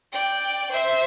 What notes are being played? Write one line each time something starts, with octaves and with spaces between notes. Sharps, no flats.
D5 G5
C5 E5